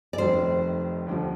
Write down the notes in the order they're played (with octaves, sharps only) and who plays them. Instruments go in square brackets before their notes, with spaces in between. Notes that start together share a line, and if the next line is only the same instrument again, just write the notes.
[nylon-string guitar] D5
[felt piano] F1 F2 D#3 [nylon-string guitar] C5
[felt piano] D#2 D3 F3